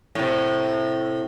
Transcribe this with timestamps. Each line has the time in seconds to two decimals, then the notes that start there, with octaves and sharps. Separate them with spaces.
0.15 A2 C3